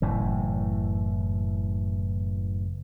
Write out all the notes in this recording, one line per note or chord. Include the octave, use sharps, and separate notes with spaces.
F#1 A2 E3